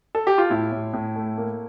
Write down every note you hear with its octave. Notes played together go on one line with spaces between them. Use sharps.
A4
G4
F4
A2 E4
A2
A2
A3
A#3